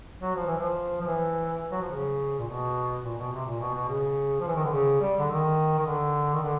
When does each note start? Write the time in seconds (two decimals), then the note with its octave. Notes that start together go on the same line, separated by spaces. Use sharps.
0.22 F#3
0.36 F3
0.47 E3
0.58 F3
1.01 F3
1.07 E3
1.72 F#3
1.82 F3
1.91 C#3
2.39 A#2
2.47 B2
3.03 A#2
3.18 B2
3.32 C3
3.46 A#2
3.60 B2
3.74 B2
3.88 C#3
4.40 F3
4.48 E3
4.56 D#3
4.65 D3
4.73 C#3
5.01 G3
5.19 D3
5.29 D#3
5.79 D#3
5.86 D3
6.34 D#3
6.43 D3